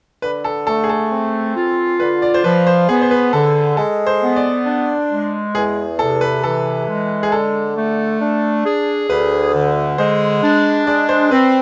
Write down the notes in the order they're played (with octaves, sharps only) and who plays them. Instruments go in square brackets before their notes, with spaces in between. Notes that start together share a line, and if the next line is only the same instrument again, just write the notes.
[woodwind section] D3 [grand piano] B4
[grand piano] A4
[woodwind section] A3 [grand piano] A4
[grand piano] G#4
A4
[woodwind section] C4
F4
[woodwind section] D3 [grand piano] B4
[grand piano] D5
C5
[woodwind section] F3 [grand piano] B4
[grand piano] C5
[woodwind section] B3 [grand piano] G#4
[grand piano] C5
B4
[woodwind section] D3 [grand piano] A4
[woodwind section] G#3 [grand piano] A4
[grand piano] C5
[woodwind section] B3
[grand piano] D5
[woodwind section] D4
G#3
[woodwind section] E2 [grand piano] G#4
[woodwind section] C3 [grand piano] A4
[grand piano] B4
[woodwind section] E3 [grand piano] A4
[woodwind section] G#3
[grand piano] G#4
[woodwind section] D3 [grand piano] A4
[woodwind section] A3
D4
G#4
[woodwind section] D2 [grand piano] B4
[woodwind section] D3
[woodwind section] G#3 [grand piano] C5
[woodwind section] D4
[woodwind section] G#3 [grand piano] D5
[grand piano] C5
[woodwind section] C4 [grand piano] B4